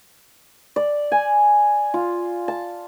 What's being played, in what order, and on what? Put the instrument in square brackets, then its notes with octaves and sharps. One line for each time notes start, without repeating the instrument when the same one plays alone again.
[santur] D5
G#5
F4
A5